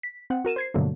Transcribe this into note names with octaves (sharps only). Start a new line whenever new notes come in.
B6
C4 F#5
F#4 A#4 D#7 E7
C5 G#6 C7
G2 B2 D3 F#3 A3 A#3